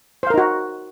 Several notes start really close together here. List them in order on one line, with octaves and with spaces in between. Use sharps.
C5 F5 A#4 D#4 F#4